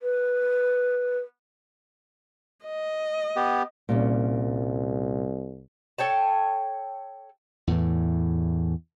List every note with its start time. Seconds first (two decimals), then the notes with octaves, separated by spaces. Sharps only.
0.02 B4
2.65 D#5
3.36 B3 G4
3.89 C2 A#2 G3 C#4
5.98 A4 C#5 G5 A5
7.67 E2 A2 E3